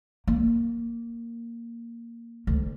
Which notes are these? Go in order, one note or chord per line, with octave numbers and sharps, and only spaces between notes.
A#3
D2